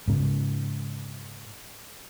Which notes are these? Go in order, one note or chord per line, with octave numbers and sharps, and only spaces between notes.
G#2 C#3